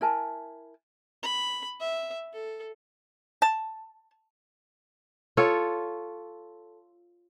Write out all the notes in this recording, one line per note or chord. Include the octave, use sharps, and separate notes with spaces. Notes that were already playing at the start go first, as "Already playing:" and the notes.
E4 A#4 G#5 A5
B5
E5
A4
A5
F4 A4 C#5